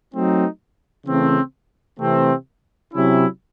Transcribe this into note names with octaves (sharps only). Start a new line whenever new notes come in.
F#3 A3 C4 D#4
C#3 E3 A3 C4
C3 E3 A3 C4
C3 F#3 C#4 E4